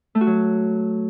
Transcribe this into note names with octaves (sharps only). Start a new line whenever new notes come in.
A3
F#4
F#3